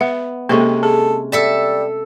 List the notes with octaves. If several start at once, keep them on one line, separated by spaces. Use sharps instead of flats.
B3 E5
C3 G#3 A#3 C#4 A4
G#4 A4
G3 A4 E5 A5